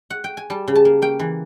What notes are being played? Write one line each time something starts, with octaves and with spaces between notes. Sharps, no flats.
F#5
G5
G#5
G3 A5
C#3
A5
A#3
A#3 G5
E3